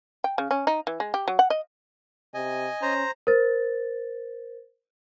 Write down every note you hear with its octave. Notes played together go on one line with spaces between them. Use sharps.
G5
C#3
C#4
D#4
E3
G#3
G4
F#3
F#5
D#5
C3 D#5 G#5
C#4 C5 A#5
A#4 C5 A6